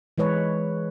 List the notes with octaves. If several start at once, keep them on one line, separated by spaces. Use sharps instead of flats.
E3 G#3 B4 C#5